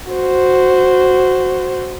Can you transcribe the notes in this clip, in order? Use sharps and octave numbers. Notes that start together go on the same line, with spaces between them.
F#4 C5